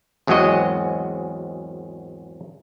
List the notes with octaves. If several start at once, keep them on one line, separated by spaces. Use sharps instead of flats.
G#1 E2 F#3 G#3 F#4 D#5